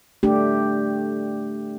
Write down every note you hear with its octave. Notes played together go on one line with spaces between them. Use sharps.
A3 D4 G4